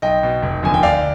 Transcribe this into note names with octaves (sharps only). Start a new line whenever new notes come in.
B1 D#5 G5
B2
F1
D#2 D3 F3 G#5
G5
D2 D5 F5